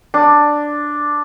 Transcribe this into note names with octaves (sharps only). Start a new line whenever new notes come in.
D4